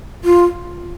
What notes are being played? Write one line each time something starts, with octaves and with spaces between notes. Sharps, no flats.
F4